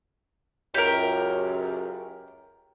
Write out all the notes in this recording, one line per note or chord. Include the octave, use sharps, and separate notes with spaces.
C#2 F#2 G4 A#4